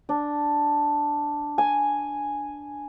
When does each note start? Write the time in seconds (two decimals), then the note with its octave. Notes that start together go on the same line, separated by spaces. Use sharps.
0.09 D4
1.58 G#5